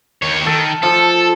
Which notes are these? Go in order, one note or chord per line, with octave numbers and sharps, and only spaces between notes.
D#2 C#5
D#3 A4
F3 A4